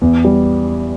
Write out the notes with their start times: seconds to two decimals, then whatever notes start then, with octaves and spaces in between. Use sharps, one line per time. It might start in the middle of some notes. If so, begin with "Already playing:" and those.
0.01 E2
0.25 G3